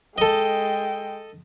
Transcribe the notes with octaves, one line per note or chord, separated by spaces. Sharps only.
G#3 A4 D#5 G5